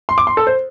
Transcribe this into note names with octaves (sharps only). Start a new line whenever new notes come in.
C6
D6
C6
A4
C5